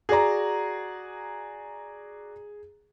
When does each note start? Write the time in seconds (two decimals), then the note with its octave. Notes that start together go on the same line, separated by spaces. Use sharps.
0.09 F#4 G#4 D5 A#5